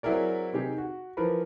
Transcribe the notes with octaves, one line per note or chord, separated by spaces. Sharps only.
F#3 C4 E4 G#4 A#4 D5
C3 D#3 D#4 G4 G#4
F#4
E3 F3 A#4 B4 B5